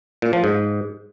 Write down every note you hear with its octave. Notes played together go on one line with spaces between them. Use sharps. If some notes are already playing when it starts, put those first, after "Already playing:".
A#2
F3
G#2